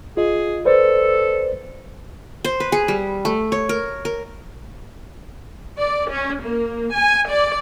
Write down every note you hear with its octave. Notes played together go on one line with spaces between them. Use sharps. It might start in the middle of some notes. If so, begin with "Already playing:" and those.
F4 G#4 D#5
A4 B4 C5 D5
C5
B4
G#4
G3
A3
C#5
A#4
A#4
D5
C#4
A#3
G#5
D5